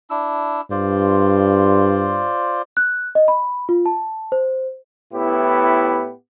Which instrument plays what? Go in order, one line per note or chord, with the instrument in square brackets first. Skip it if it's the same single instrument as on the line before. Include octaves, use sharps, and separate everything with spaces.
[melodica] D4 E4 E6
[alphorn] G2 [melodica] F4 C5 D5
[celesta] F#6
D#5
B5
F4
A5
C5
[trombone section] A2 B3 E4 G4